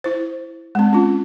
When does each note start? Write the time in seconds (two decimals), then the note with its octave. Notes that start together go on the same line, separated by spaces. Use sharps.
0.04 E4 C5
0.75 G#3 C4
0.93 C#4 F4